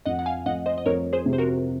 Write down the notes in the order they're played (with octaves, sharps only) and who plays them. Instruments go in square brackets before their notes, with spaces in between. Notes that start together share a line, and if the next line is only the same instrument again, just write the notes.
[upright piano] F2 [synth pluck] D#5 F#5
[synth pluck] F#5
F5 G#5
[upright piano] F2 [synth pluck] D#5 F#5
[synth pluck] C5 D#5
D#5
[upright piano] F2 [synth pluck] A#4 C#5
[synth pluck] G#4 C5
[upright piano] C3
[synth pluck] C5
F#4 A#4